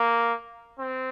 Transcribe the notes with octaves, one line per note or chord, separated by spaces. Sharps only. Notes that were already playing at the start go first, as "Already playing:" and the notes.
Already playing: A#3
C4